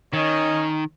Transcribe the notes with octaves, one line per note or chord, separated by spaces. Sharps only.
D#3 C#4 C#5 D#5